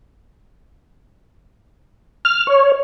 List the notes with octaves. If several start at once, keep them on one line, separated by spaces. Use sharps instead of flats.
F6
C#5